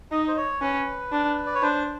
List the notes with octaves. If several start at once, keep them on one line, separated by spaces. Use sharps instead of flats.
D#4 D#5
C5
C#5
C#4 B4
D4
D5
C#5
D4 C5